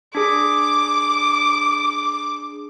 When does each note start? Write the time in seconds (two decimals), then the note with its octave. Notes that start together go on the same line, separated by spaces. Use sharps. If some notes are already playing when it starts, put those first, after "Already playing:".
0.15 D4 G#4 D6